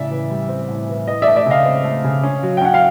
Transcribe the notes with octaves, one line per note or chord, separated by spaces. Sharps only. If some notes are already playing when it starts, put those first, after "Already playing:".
Already playing: A2 C#3 D5 E5
E3
G3
C4
A2
E3
E3 D#5
D5 E5
A3
D5 E5
C#3 D#5 F5
C4
A3
C#3
C#4
F#3
G5
C#4 F#5
F5